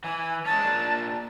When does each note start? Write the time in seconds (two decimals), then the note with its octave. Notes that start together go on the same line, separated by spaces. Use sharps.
0.04 E3 G#5
0.45 G#3 C#4 A5
0.59 A#2 D4